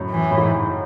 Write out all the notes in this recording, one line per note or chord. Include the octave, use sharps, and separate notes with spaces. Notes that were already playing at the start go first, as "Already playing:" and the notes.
Already playing: F#2 A2
E3
A2
G#2